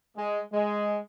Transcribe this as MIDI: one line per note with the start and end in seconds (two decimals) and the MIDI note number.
0.17 0.40 56
0.53 0.97 56